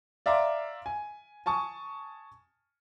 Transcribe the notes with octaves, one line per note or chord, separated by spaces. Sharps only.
D5 E5 F5 A#5 C6 D6
G#5
G#5 A5 C#6 D#6